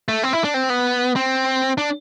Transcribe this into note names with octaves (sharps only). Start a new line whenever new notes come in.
A3
C4
E4
D4
C4
B3
C4
D4